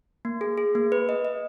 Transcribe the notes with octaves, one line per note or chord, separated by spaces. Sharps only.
A#3
G#4
G#4
A#3
B4
D#5
D#5